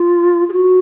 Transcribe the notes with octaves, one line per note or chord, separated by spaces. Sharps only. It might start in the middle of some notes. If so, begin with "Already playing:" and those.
Already playing: F4
G#4
F#4